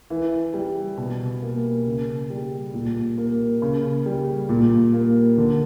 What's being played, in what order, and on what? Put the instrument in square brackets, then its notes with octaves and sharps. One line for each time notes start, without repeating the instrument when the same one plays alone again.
[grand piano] E3
G3
B2
A#3
C#3
G3
A#2
A#3
C#3
G3
A#2
A#3
D3